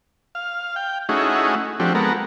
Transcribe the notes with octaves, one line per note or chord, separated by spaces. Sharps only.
F5
G5
A3 C#4 D#4 E4 F#4 G#4
F3 A3 C4 D4 F#4 G4
G#3 B3 F#4 A4 A#4